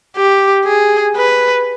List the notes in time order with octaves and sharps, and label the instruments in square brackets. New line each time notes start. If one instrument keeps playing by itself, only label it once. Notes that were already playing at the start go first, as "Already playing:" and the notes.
[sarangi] G4
G#4
B4